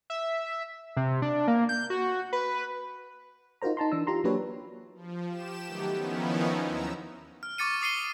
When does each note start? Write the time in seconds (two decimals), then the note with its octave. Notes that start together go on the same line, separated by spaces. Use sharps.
0.10 E5
0.97 C3
1.22 D4
1.48 A#3
1.69 G6
1.90 F#4
2.33 B4
3.62 D#4 F4 F#4 A#4 C5 A#5
3.77 D#4 A5 A#5 C6
3.92 E3 D4 E6
4.07 F4 G4 A#5 C6
4.24 F#3 A#3 D4 G4 B4 C#5
4.95 F3
5.29 G4 E7
5.66 D#3 F#3 A3 B3 G4
5.96 D#3 F3 B3 C#4 D#4 E4
6.63 D#2 F#3 A#5 E6
7.43 F6
7.58 C#6 D6 A6 C#7 D#7
7.81 D6 D#6 C7 C#7 D#7 G7